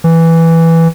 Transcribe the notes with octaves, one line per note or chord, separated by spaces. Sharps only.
E3